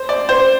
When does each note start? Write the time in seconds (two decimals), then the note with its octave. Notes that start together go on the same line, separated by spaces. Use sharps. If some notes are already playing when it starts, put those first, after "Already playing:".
Already playing: C5
0.09 D5
0.29 C5